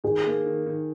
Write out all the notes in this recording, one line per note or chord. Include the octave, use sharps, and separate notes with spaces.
D#3 G#4
A#3
D#3
D#3